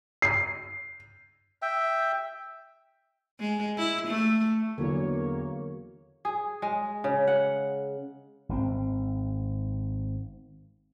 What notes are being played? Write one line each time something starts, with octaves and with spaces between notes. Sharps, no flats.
C7
E5 G5
G#3
E4
A3
E2 D3 F#3 A#3 F#4 C#5
G#4
G#3
C#3
F#5
G#1 B2 C4